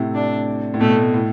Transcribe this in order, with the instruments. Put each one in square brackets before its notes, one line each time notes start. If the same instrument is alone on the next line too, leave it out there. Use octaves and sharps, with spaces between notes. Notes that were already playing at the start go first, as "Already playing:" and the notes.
Already playing: [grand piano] A2 C3
[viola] D4
[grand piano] A2
[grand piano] B2 [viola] A3
[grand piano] A2